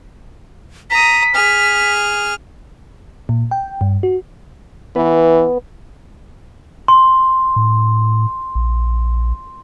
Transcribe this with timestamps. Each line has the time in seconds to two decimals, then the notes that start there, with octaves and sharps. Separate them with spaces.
0.90 A#5 D#6 B6
1.34 G#4 F6
3.29 A#2
3.51 G5
3.81 G2
4.03 F#4
4.96 E3 B3
6.88 C6
7.56 A2
8.55 A#1